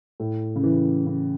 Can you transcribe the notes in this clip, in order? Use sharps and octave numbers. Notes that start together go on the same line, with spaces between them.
A2
C#3
E3
C#3